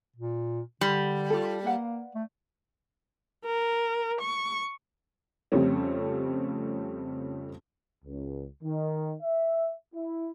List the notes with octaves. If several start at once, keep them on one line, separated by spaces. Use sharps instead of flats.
A#2
D3 G3
F4 A4
A#3 B4 F5 F#5
A3
A#4
C#6
F2 C#3 G3 A3 C4 C#4
C#2
D#3
E5
E4